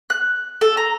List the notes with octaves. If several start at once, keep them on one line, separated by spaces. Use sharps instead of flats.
F#6
A4
A#5